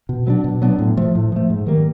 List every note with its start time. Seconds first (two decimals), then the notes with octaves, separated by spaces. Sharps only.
0.09 B2
0.27 F#3 B3 D4
0.44 B2
0.62 F#3 B3 D4
0.79 A2
0.97 F3 A3
1.15 A2
1.32 F3 A3
1.50 G#2
1.67 D#3 G3 A#3